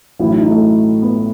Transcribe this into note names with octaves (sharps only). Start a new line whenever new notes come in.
A1 A2 F#3 E4
D#4
D#4
A3
B3